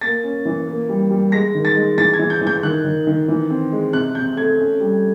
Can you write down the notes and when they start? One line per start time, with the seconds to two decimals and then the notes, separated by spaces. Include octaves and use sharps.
0.01 A#3 A6
0.23 C#4
0.45 E3
0.67 A#3
0.89 G3
1.11 G3
1.32 G#3 A#6
1.55 D#3
1.65 A6
1.76 G#3
1.97 E3 A6
2.13 G#6
2.19 E3
2.30 G6
2.41 E3
2.47 G6
2.63 D#3 F#6
2.84 D#3
3.07 D#3
3.28 E3
3.50 C4
3.72 G#3
3.93 C3 F#6
4.15 C3 G6
4.37 A3 G#6
4.59 C#4
4.80 G3